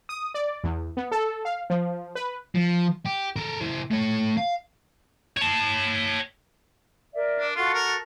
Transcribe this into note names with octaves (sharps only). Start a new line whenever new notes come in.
D#6
D5
E2
B3
A4
F5
F3
B4
F3
G4
A4 A#4
E4 C5
A3 C#5
F5
C#5 A5
A#4 D5 E5
D4
F4 F#4 A4
A#4